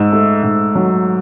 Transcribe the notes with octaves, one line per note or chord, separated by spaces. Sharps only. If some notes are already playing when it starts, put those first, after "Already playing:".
Already playing: G#2 E6
A3
G#2
F#3